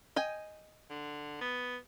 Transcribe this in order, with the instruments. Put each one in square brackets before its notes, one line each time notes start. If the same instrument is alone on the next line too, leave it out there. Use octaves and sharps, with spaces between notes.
[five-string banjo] D#5 G5 G#5
[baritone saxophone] D3
B3